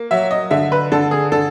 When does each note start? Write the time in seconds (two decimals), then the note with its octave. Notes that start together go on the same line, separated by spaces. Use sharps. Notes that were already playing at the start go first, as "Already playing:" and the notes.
Already playing: A#3
0.11 F#3 E5
0.31 D#5
0.51 D3 E5
0.72 B4
0.92 D3 A4
1.11 G#4
1.32 D3 A4